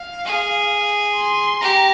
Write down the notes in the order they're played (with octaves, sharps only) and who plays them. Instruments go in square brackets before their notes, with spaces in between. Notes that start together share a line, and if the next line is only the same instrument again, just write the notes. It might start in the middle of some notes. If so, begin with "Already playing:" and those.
Already playing: [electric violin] F5
[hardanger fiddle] G#4
[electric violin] C6
[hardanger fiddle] G4 [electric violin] A#5